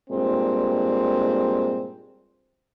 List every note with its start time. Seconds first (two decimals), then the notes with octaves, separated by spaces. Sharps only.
0.10 G2 A#2 G#3 C4